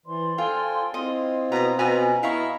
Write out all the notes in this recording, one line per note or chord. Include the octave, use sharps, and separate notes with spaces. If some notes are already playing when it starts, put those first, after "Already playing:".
E3 C5 D5 C6
F4 A4 G5 G#5
C4 E4 F4 D#5
B2 A#5 D#6
B2 C#4 G#5 A#5 B5
B3 E4 D#5 F5 G5 A#5 C#6